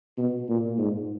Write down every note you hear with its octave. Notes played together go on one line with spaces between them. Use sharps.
B2
A#2
G#2